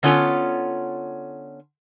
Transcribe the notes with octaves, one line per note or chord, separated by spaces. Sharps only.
D3 B3 C#4 F4 A4